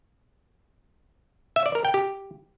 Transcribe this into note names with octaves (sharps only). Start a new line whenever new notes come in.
E5
D5
A#4
G5
G4